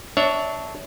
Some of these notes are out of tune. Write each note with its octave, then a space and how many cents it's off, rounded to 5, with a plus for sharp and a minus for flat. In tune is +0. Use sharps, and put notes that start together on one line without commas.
D4 +0 C#5 +15 E5 -20